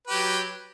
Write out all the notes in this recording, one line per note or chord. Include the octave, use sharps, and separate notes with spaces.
F#3 G4 B4